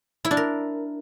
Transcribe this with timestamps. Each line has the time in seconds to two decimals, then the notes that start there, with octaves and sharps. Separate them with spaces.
0.25 E4
0.31 D4
0.37 A#4